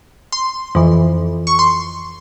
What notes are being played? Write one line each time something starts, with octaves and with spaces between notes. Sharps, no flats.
C6
F2 E3
C#6
C6